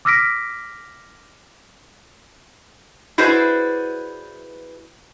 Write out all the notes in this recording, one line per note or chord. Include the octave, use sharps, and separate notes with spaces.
D6 E6 F6 A#6 B6 D7
E4 F#4 G#4 B4 C5 D5